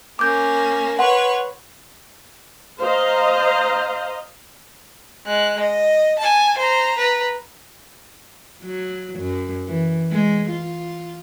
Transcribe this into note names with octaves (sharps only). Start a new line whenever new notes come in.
A#3 C#4 D6 G6
B4 C#5 F#5 C6
C5 D#5 F5 A#5
G#3 F#6
D#5
G#5 A5
C5 A#5
B4 A#5
F#3
F#2
E3
G#3
F4